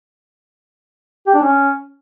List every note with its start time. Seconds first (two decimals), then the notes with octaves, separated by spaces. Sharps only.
1.27 G4
1.34 D4
1.42 C#4